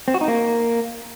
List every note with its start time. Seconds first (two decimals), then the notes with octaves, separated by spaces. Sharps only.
0.08 C4
0.14 F#4
0.21 D#4
0.28 A#3